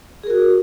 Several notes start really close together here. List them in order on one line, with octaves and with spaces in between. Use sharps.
G#4 A#4 F#4